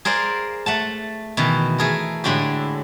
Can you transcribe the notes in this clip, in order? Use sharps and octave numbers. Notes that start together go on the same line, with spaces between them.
G#4 A#4 C5 D5 F5
A3 F#5 A5
B2 D#3 E3
A3 G#4 A#4
A2 D3 G#3 D4 F#4 G4